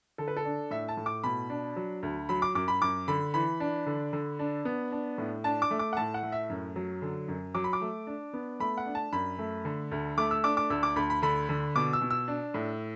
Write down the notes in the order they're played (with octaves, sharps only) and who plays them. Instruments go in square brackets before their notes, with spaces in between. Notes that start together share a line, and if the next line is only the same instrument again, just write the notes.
[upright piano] D3 A4
B4
A4
D4
A2 E5
A5
A2
D6
B2 B5
D4
F#3
D2
F#3 B5
D6
F#2 D6
B5
F#2 D6
D3 B5
E3 B5
D4
D3
D3
D4
B3
D4
A2
D4 A5
D6
A3
D6
F#5
A2 A5
F#5
A3
E5
F#2
F#3
D3
F#2
F#3 D6
B5
D6
A3
D4
B3
A3 B5
F#5
D4
A5
F#2 B5
A3
D3
D2
A3 D6
E6
D4 D6
D6
D2 E6
D6
D2 B5
B5
D3 B5
D3
B2 D6
E6
B2
E6
D4
A2